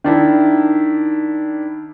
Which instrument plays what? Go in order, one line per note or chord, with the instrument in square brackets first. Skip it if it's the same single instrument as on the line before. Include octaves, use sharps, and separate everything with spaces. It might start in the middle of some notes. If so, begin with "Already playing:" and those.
[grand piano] D#3 D4 E4